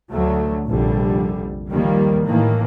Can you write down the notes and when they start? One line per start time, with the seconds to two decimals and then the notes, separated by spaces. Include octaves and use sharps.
0.12 D2 D3 F#3 A3
0.67 F1 A#1 D3 G3
1.70 D#2 D#3 F3 G3 A#3
2.25 A2 D#3 E3 A#3